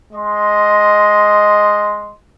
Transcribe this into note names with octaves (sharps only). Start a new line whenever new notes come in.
G#3 D#5 C6